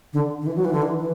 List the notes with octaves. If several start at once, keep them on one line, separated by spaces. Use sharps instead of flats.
D3
D3
E3
F#3
E3
D3
E3
E3